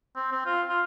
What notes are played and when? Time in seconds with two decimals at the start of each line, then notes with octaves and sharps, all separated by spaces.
0.16 C4
0.32 C4
0.46 F4
0.69 F4